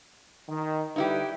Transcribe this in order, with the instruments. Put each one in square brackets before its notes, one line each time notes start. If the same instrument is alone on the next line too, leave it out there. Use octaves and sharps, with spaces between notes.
[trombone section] D#3
[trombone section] D3 G3 B4 [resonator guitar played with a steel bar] D#4 E4 G4